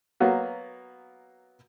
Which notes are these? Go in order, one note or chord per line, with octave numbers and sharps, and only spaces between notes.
F#3 A#3 B3